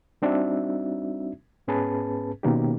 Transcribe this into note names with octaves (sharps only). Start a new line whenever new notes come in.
G3 C4 D4 D#4 F#4 E5
G#2 B3 C#4 G#4 B4 A5
B2 D#3 A#3 C#4 D#4 G4